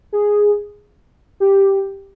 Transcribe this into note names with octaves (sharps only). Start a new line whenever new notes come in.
G#4
G4